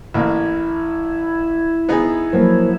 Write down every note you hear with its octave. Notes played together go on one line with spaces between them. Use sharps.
A1 A#3 E4
B3 D#4 G#4
F3 F#3 A#3